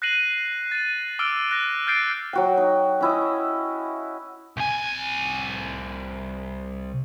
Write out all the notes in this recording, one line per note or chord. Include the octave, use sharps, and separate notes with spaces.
F#6 A#6 C7 D#7 F#7
A6 D#7
D6 E6 F6 D7 G7
F#6 A#6
F6 G6 A6 C7 D7
F#3 F#4 G5
D#4
C#4 E4 D#5
C2 G#5